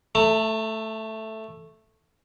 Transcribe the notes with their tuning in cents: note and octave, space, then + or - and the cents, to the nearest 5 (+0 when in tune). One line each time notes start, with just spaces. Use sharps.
A3 +0 A5 +45